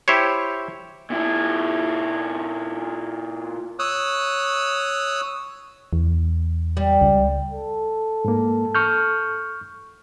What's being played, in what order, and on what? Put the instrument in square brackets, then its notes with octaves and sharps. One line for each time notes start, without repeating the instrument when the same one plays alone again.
[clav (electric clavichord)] E4 G4 C5 C#5
[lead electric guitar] A#2 E4
[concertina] C#5 D#6 E6 F#6
[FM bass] E2
[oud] G3
[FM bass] C#2
[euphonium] A4
[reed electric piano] G#2 A#3
C#6 F6 G6